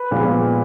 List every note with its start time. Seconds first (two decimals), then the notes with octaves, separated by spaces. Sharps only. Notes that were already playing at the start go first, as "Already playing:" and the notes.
Already playing: B4 B5
0.11 A#2 F3 G#3 B3